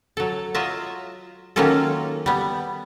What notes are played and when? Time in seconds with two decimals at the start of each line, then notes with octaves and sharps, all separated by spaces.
0.17 F#3 A4
0.55 F#3 F4 D#5 E5
1.56 D#3 F#3 A#3 C#4 F4 A4
2.26 G3 B3